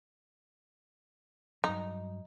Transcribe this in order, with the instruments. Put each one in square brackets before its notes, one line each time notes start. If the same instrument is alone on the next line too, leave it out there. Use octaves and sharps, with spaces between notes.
[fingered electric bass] G2 F#3 [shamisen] D#4